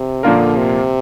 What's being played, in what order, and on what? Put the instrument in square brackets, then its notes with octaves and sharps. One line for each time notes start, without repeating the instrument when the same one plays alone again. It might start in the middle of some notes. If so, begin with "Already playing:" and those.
Already playing: [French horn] C3
[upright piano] A#2 F3 A#3 F4 A#4 [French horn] D3
[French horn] C3